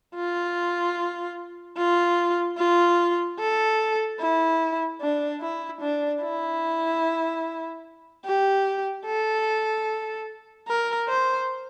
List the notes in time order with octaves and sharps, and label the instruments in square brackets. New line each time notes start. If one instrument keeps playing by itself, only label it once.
[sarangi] F4
F4
F4
A4
E4
D4
E4
D4
E4
G4
A4
A#4
C5